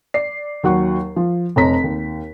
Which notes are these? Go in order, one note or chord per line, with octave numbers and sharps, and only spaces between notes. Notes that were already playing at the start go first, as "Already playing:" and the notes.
D5 C7
D#2 F#3 F#5 C#6
F3
F1 C4 C#5 A#5 B6
D#2